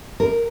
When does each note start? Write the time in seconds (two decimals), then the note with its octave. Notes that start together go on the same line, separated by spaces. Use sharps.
0.20 A#4